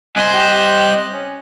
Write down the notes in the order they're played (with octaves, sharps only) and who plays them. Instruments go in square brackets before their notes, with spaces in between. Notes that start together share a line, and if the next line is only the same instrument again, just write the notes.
[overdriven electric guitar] C2 C5 [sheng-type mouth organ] D#5 F#6 [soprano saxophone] G#5
[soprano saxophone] G4
C#4